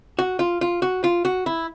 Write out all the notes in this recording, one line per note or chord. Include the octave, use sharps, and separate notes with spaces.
F#4
F4
F4
F#4
F4
F#4
E4